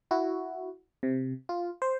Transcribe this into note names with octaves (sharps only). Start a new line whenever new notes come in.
E4 F#4
C3
F4
C5